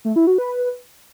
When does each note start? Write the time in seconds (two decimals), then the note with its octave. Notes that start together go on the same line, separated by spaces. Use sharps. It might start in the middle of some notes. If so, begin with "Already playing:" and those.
0.05 A3
0.16 E4
0.27 F#4
0.38 B4